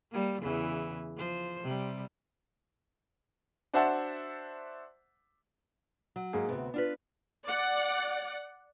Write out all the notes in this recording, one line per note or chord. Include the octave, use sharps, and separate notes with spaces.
G3 A#3
E2 C#3 E3
F3 C5
C3 G3
D4 F#4 C5 E5 F#5 A5
F#3
G#2 A#3 G#4
D2 C3 B3
D4 F4 B4
D5 F#5